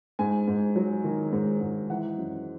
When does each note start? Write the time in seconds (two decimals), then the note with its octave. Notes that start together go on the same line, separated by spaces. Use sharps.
0.19 G#2 G#5
0.47 G#2
0.76 F#3
1.04 D#3
1.32 G#2
1.61 G#2
1.90 E3 F#5
2.18 F#2